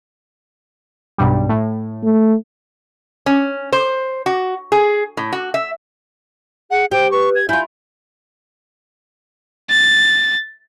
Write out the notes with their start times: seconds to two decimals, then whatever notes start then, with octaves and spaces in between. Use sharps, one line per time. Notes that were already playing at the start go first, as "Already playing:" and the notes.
1.18 B1 G2 G3
1.49 A2
2.03 A3
3.26 C#4
3.73 C5
4.26 F#4
4.72 G#4
5.17 A2
5.33 F#4
5.54 E5
6.71 G#4 F#5
6.91 G4 C5 G5
7.11 B4 C#6
7.35 G#6
7.49 E4 F4 G#5 G6
9.70 A6